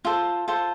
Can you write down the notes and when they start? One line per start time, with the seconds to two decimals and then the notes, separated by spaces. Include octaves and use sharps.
0.05 F4 A4 C5
0.48 F4 A4 C5